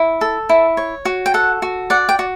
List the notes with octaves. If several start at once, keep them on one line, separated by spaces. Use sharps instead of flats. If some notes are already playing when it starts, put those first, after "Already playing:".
Already playing: E4
A4
E4
C#5
F#4
G5
A4 F#5
F#4
D5 F#5
G5
F#4